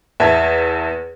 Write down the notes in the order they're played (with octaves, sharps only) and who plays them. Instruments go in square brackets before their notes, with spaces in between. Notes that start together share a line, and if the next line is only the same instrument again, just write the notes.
[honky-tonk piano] E2 [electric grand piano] E5 A5 G#6